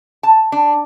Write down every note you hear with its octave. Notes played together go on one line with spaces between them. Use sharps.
A5
D4